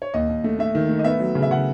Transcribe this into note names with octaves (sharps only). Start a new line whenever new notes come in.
C#5
D#2 D#5
D#2
A3
A3 E5
D#3
A3
D#5
B3 E5
F#3
C#3
E5
C#3 F#5